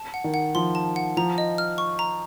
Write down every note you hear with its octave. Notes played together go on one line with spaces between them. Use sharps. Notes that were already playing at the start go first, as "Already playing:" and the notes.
Already playing: A5
F#5
D#3
F#5
F3 C6
A5
F#5
F3 A#5
D#5
F6
C#6
A#5